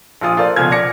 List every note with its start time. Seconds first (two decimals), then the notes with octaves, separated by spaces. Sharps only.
0.21 A#1 F4 D#6
0.37 F4 A4 A#4 C5 D5
0.56 C#2 B2 F3 G#5 F6 G#6
0.70 D5 D6 F6 A#6 C#7